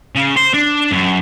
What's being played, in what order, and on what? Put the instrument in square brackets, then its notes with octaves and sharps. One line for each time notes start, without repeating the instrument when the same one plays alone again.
[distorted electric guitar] C#3
C5
D4
F#2